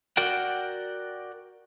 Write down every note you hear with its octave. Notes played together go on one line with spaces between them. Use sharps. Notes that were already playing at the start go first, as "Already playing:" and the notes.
F#4 A#4 D5 F#5 G5